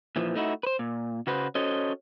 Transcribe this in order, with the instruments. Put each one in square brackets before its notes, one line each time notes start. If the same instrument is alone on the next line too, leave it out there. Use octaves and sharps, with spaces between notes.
[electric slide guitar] A#2 E3 F3
A3 D#4 E4 F#4
B4 C5
A#2
C#3 F#4 B4 C5
C#4 F#4 A4 C5 C#5 D#5